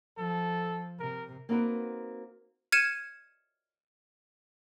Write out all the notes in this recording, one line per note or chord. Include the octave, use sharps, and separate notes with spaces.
F3 A4
C3 A#4
A#3 C4 D#4 F#4 A#4 B4
F6 G#6 C#7 D#7 E7